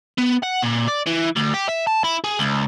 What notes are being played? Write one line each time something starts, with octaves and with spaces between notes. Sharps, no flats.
B3
F#5
A#2
D5
E3
D2
G4
E5
A5
E4
G#4
C#2